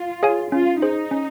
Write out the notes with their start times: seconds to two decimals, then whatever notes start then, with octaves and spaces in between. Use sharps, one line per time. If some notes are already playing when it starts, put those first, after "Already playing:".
Already playing: F4
0.23 G#4 C#5 F5 G#5
0.52 C#4 F4
0.82 D#4 G#4 C5
1.11 C#4